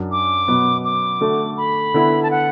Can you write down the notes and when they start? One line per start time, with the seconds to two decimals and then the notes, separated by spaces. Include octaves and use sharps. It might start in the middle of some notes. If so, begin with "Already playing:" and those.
Already playing: F#2 F#3 D4
0.12 D6
0.48 B2 F#3 B3
0.85 D6
1.21 D3 A3 F#4
1.57 B5
1.94 D3 B3 E4
2.23 A5
2.31 F#5